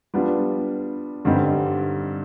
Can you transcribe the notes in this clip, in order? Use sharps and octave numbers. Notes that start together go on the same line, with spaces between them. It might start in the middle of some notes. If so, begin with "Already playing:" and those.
G3 B3 D4 F4
G2 D3 G3 C4 D#4